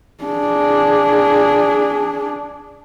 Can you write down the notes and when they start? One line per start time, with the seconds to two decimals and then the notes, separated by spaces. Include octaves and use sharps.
0.24 D4 G#4